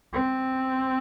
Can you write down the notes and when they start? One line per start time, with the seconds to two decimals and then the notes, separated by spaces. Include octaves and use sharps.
0.13 C4